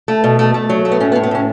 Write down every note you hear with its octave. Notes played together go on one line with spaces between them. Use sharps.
A3
B2
A3
A3
F#3
A3
B3
A2 C#4
B3
A2
B3
A2 C#4